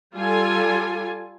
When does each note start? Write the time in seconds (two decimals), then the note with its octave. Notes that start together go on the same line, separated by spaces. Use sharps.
0.15 G3 F4 A4 G#5